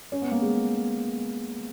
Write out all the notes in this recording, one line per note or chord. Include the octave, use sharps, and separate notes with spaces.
C#4
B3
A#3
G#3